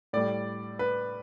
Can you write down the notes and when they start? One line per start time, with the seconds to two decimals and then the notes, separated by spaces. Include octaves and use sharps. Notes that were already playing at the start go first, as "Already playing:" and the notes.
0.13 A2 G3 D5
0.79 B4